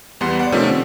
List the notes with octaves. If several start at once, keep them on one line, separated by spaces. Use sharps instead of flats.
E2 G3 B3 F#5 C6
D5 F#5
C3 D#3 F3 A3 C#4
C4